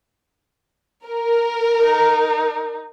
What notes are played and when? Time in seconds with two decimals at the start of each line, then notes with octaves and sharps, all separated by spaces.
1.06 A#4
1.80 D#4